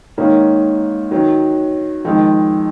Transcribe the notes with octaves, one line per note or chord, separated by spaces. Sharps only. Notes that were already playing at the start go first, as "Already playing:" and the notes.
G#2 D#3 A#3 C#4
D#3 F#3 C#4
F2 D#3 G#3